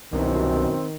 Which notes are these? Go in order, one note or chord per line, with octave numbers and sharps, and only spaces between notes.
C2 F#2 B2 D#3 C4